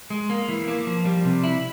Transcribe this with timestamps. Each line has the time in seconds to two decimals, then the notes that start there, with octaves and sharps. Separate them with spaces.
0.10 G#3
0.30 A#3
0.49 E3
0.68 A#3
0.87 F3
1.05 G3
1.25 C3
1.44 E4